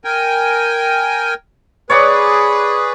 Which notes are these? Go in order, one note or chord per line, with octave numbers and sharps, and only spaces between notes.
A#4 G5 G#5
G#4 B4 C#5 D5 F#5